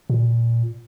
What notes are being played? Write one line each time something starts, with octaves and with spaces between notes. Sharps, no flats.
A#2